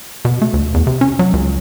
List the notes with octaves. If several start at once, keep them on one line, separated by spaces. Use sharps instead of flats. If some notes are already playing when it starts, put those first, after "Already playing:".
B2
A3
D2
E2
C3
C#4
F#3
C#2